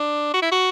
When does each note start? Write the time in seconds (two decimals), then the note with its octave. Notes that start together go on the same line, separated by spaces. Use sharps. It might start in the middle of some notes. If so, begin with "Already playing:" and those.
Already playing: D4
0.34 F#4
0.42 E4
0.52 F#4